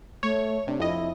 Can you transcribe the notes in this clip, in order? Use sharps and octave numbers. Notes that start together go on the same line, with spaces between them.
A3 C#5
C3 D4
F2 E4 D#5